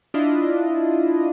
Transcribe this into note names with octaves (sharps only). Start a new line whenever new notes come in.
D4 E4 F4 D#5